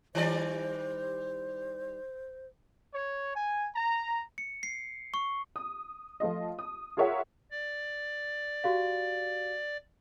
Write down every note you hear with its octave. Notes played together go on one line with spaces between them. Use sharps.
D#3 G3 C5 D5
C#5
G#5
A#5
C#7
C7
C#6
D#6
F3 A3 F4 D#5
D#6
F4 G#4 A#4 C#5 E5 F#5
D5
F#4 G4 F5